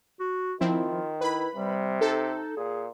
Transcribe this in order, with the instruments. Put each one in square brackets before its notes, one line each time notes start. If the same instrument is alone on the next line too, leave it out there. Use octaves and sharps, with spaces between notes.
[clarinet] F#4
[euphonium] D#3 [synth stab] F3 C4 E4 [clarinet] F4
[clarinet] E4 [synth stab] B4 B5
[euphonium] C3 [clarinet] G3
[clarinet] D#4 [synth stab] A4
[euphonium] A#2 [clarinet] G#4